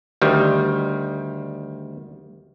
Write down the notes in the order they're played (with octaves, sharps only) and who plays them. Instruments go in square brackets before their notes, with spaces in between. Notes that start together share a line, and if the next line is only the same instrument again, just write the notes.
[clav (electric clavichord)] D2 D#3 G3